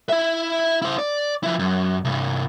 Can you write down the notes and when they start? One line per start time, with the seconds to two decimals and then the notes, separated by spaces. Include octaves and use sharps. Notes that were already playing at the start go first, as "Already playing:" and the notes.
0.09 E4 E5
0.82 E4 C5
0.98 D5
1.43 F3 E4
1.59 F#2
2.05 C2 G2